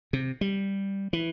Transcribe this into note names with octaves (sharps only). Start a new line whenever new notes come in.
C3
G3
E3